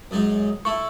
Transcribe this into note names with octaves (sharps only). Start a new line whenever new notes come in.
F#2 G#3 D#4
A3 E4 C#6